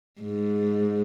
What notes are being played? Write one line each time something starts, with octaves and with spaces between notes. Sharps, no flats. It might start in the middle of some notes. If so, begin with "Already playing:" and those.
G#2